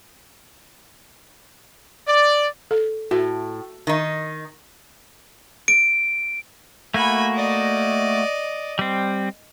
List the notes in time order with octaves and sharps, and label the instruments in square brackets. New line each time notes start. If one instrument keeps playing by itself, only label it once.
[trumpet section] D5
[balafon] A4
[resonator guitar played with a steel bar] A2 [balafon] F#4
[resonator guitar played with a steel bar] D#3 D#4
[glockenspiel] D7
[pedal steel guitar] A3 A#3 F#4 [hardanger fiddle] G#5 B5
[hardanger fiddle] D5 D#5
[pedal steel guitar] G3 C4